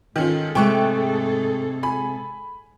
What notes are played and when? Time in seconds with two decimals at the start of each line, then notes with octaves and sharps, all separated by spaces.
0.16 G#2 D#3 C#4 F4 G#4 A4
0.55 C3 G#3 A3 G5 C#6 F#6
1.83 G#5 B5